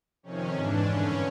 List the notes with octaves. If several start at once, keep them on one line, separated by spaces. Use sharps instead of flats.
F2 C3 D#3 C#4
G#2 E3 D4
G2 D3 C#4